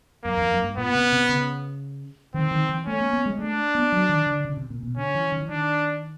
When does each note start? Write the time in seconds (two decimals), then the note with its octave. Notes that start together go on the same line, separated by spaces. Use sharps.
0.24 F#2 A#3
0.37 F2
0.51 F#2
0.64 G2
0.77 A#2 B3
0.95 C3
1.12 C3
1.29 C#3
2.34 D#3 C4
2.51 D#3
2.69 E3
2.86 A3 C#4
3.00 A#3
3.13 B3
3.26 G#3
3.39 A3 D4
3.75 B3
3.92 F#3
4.09 D#3
4.27 D3
4.45 C#3
4.57 C3
4.70 A#2
4.83 B2
4.96 D3 C#4
5.15 E3
5.32 D#3
5.41 E3
5.49 D#3 D4